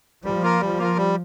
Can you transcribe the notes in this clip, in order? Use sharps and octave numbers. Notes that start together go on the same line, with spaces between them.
F3 G3
A#3 F4 A#4
F3 G3
A#3 F4 A#4
G3